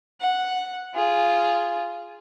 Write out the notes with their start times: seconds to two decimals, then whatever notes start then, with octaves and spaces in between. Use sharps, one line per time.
0.20 F#5
0.95 F4 G#4